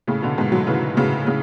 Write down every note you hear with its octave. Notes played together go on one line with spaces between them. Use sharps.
A2 C#3
B2 D3
G#2 B2
D3 F#3
C#3 E3
A2 C#3
A2 C#3